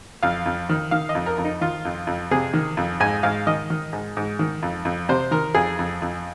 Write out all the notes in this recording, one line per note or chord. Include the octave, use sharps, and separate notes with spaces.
F2 F5
F2
D#3
D#3 F5
D#5
F2
A#4
F2
D#4
D#3 F4
F2
F2
C3 G#4
D#3
F2
G#2 G#5
G#2 F5
D#3 D#5
D#3
G#2
G#2
D#3
F2
F2
C3 C5
D#3 A#4
F2 G#4
F2
F2